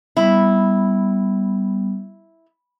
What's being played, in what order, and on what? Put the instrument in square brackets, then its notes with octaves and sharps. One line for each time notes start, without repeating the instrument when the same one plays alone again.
[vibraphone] G3 B3 [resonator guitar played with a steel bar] E4